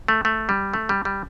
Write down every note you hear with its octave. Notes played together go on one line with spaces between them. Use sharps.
A3
A3
G3
A3
G3
G3